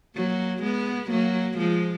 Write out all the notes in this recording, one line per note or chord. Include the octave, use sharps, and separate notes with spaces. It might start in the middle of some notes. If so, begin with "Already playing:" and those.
F#3 A#3
G#3 B3
F#3 A#3
F3 G#3